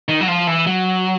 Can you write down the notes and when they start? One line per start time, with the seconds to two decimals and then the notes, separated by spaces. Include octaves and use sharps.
0.08 D#3
0.21 F#3
0.28 F3
0.47 E3
0.67 F#3